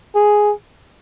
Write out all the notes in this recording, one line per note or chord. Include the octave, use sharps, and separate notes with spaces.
G#4